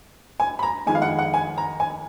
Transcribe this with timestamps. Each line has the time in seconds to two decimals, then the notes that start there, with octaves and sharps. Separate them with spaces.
0.40 G#5
0.59 B5
0.63 A#5
0.86 F2 D#3 G#3 B3 G#5
0.95 F5
1.02 F#5
1.19 F#5
1.34 G#5
1.58 A#5
1.80 G#5